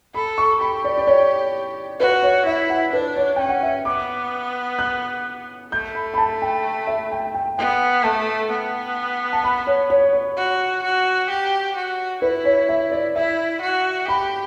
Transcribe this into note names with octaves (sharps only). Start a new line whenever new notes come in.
A4 B5
C#6
G4 B5
D5
D5
C#5
F#4 B4
C#5
E4 E5
F#5
D4 B4
C#5
C#4 G5
F#5
E5
B3 D6
F#6
A3 G6
B5
B5
A5
G5
E5
G5
G5
B3 G5
A3 A5
B3
A5
B5
C#5
C#5
C#5
F#4
F#4
G4
F#4
E4 B4
C#5
E5
D5
E4 E5
F#4
G4 B5